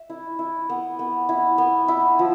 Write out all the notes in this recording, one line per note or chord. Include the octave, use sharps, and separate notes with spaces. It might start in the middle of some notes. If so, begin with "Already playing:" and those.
Already playing: E5
E4
E4
B3
B3
E4
B3
E4
F3